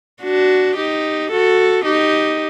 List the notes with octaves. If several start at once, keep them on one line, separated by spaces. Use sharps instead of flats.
D4 F#4
D#4 G4
F#4 A4
D#4 G4